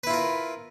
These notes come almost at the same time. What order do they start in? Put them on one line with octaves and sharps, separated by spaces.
B4 E4 F4 A#4